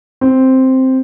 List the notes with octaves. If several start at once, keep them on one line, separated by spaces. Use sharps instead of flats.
C4